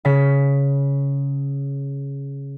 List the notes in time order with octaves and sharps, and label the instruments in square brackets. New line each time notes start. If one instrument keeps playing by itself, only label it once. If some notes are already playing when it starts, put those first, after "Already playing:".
[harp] C#3 B6